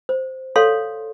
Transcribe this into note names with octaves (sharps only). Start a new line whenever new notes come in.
C5
A4 C#5 F5 C6